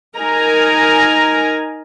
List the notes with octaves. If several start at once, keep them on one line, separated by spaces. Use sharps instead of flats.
D#4 A#4 G#5 A#5